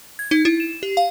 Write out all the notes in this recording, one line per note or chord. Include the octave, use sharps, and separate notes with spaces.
G#6
D#4
E4
E7
G4
F5